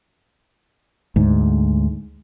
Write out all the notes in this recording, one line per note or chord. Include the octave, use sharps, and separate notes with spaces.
D2 G#2